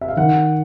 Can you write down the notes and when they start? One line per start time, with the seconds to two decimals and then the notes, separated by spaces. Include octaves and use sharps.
0.01 E5
0.08 F5
0.17 D#3 F#5